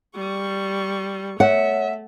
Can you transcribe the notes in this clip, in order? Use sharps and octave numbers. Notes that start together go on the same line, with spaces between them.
G3 C#6
A3 C#5 E5 F#5